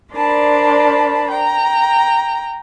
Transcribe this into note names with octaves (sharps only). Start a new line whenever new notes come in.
D4 A#4 C5 D5 A5 B5
G5 A#5